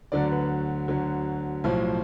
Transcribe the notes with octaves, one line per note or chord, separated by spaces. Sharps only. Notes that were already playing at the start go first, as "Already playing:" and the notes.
D2 D3 F#3 D5
B4
D2 D3 F#3
B1 A2 F3